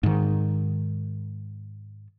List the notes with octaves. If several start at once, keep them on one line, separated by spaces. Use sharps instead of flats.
G#2 D#3